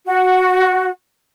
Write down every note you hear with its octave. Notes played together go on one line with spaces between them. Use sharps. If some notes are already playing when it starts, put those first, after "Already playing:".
F#4